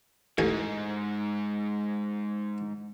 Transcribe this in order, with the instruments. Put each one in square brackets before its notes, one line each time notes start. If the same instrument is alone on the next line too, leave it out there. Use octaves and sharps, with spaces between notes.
[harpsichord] A1 G#5 [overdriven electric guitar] G#2